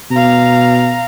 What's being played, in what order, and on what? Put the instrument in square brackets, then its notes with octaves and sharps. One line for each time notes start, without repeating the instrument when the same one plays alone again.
[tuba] B2 [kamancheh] F5 A#5